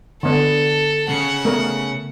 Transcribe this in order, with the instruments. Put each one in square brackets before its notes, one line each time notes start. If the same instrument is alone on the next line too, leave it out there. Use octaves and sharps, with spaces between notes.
[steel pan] D3 B3 [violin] A4
[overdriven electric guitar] C#3 [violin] F#5
[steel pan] A3 B3 A#4